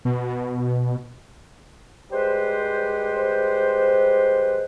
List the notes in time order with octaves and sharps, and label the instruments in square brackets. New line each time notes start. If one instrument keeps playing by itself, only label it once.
[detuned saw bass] B2
[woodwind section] G3 G#3 B4 C5